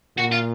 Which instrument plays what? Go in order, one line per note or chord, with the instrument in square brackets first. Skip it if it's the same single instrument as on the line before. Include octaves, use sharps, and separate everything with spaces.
[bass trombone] A#2 [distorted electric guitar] F#4
[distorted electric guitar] F4